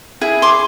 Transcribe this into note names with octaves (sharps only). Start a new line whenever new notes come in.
E4 G#4
C6 D6